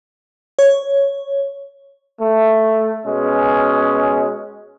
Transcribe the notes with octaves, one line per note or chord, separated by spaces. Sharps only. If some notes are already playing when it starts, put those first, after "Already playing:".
C#5
A3
B2 G#3 C#4